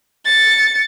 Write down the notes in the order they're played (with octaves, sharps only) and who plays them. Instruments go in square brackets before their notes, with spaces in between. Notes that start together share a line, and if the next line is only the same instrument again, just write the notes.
[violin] A6 C#7